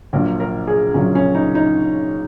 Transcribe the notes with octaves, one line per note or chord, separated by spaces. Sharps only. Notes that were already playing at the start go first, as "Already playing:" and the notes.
A#1 A#2 F#3 A#4
A#4
G#4
A#1 A#2 F#3 C#4
C#4
D#4
D#4